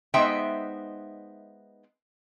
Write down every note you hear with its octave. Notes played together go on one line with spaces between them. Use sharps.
G#3 B3 D#4 C5 E5 G5